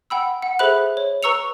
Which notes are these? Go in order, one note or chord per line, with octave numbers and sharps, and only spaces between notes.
F#5 G5 B5 E6
F#5
G#4 A4 C5 E5 B5 F#6
C#5
B4 A#5 C#6 E6 C#7 F7